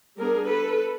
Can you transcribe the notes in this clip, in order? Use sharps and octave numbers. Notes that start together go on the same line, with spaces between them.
G3 B3 D4 G#4 A#4
A4 B4